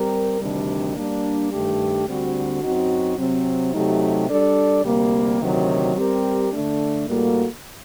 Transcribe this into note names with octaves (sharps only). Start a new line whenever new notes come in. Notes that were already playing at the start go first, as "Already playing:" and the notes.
Already playing: G3 C4 G4 A#4
D2 C3 D#3 G3 D4
G3 A#3 D4
G2 D#3 A3 D4 G4
D2 D3 G3 C4 F#4
F#2 F#3 C4 D#4 F#4
C3 F#3 C4
C3 F#3 A3 D#4 G4
G3 D4 A4 D5
D2 C3 G3 A#3
D2 C3 D#3 F#3
G3 C4 G4 A#4
D3 A3 D4
A2 G3 A#3 F#4 A4